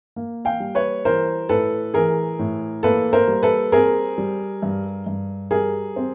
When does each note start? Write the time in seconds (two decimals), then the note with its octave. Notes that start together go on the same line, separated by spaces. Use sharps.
0.16 A#3
0.45 F5 G5
0.60 G3
0.75 B4 C#5
1.05 E3 A#4 C5
1.49 A2 A4 B4
1.94 E3 G#4 A#4
2.39 A2
2.83 A#3 A4 B4
3.13 A#4 C5
3.28 G3
3.43 A4 B4
3.72 C4 G#4 A#4
4.18 G3
4.63 G2
5.06 G2
5.51 G3 G#4 A#4
5.96 C4